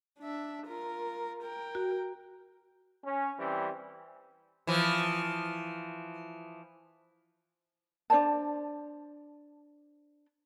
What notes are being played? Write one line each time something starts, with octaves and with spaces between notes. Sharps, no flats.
D4 E5
F4 A#4
A#4 G5
F#4
C#4
E3 G3 C4
E3 F3
D4 C5 D5 A5